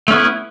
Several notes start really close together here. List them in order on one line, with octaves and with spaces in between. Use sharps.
A3 C#4 B3 E4